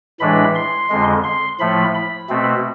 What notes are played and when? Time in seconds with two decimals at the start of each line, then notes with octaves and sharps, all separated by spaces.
0.20 A2 E3 G#3 D4 B5
0.55 C6
0.89 F2 D3 G#3
1.24 C6
1.59 A2 F3 A3 B5
1.95 B5
2.29 B2 A3 C4